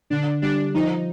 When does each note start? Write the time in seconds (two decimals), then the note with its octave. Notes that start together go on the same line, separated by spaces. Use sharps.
0.10 D3 D4
0.42 G3 D4
0.74 F3 D#4